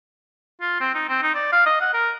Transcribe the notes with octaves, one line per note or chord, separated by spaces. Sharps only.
F4
C4
D#4
C4
D#4
D5
F5
D#5
F#5
A#4